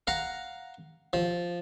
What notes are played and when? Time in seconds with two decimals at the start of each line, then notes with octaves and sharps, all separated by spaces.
0.07 F5 F#5 A#5
1.13 F3